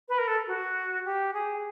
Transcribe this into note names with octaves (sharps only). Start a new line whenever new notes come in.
B4
A#4
A4
F#4
G4
G#4